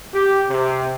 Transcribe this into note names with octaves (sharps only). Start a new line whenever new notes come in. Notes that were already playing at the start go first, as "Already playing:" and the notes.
G4
C3